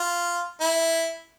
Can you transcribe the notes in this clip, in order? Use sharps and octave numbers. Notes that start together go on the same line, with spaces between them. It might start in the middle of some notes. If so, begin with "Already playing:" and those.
Already playing: F4
E4